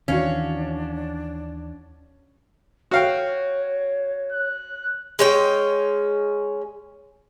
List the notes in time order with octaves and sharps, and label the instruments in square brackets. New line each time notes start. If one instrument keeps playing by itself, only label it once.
[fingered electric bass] D#2 D#3 E3 [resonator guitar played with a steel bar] C#4 [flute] D4 [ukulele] F#4 C#5 F5
[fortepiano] F#4 F5 G5 [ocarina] C#5
[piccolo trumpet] F#6
[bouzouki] G#3 C#4 G5